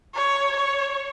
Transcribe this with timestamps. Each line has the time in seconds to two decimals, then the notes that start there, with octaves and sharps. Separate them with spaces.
0.15 C#5
0.56 C#5